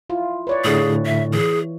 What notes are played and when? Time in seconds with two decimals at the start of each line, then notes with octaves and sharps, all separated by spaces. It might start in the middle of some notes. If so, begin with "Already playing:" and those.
0.10 E4 F4
0.47 B4 C#5 D5
0.65 A2 D3 G#4
1.06 E5
1.33 E3 G#4